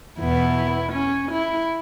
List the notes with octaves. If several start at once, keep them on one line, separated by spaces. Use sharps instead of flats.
E2 B2 B3 E4
C#4
E4